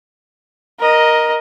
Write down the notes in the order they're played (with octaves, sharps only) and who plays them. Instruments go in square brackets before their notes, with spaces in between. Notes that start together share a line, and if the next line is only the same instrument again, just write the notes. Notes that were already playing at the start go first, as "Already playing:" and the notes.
[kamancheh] A#4 D#5